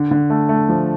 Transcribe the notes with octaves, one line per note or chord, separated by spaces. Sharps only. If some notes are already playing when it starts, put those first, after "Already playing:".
Already playing: D3
D3
A3
A3
F3